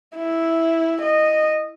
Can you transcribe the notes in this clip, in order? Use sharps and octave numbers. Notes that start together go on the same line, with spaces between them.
E4
D#5